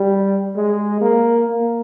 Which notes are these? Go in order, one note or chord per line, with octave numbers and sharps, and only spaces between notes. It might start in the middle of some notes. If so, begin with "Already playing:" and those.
Already playing: G3
G#3
A#3
A#3